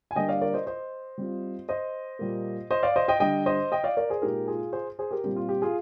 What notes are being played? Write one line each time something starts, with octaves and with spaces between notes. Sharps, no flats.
G#5
D3 G3 A#3 D#5 G5
D5 F5
A#4 D5
C5 D#5
C5 D#5
G3 C4 F4
C5 D#5
A#2 G3 A#3
C5 D#5
D5 F5
C5 D#5
D#5 G5
D3 G3 D4 D#5 G5
C5 D#5
D#5 G5
D5 F5
A#4 D5
G#4 C5
A#2 G#3 D#4 G4 A#4
F4 G#4
G#4 C5
G#4 C5
G4 A#4
A#2 G3 C4 G4
F4
G4
F4 G#4